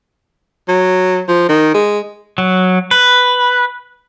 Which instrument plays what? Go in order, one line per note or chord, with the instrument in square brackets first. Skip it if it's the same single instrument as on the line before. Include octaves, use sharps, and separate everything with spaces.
[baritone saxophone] F#3
F3
D#3
G#3
[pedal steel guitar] F#3
B4